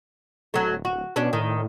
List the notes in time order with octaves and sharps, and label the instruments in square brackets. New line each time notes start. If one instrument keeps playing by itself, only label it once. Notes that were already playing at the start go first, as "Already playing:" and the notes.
[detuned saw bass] D1 [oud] F#3 A3
[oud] F#4
[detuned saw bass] B2 [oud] C#4 D4
[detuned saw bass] A2 [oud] D#3